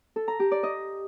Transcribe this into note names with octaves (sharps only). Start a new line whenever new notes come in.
A4
A#5
G4
D5
D#5